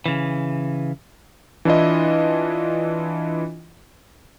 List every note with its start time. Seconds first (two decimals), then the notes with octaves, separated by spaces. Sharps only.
0.06 C#3 E3
1.65 E3 D4 E4 F4 D#5